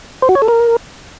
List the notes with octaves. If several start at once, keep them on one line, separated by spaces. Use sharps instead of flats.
C5
F#4
C#5
A4
A#4